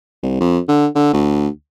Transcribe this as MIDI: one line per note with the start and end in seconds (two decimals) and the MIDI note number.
0.23 0.36 36
0.41 0.59 41
0.68 0.87 50
0.96 1.08 50
1.13 1.48 38